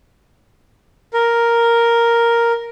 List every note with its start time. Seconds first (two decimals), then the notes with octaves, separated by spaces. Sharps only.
1.14 A#4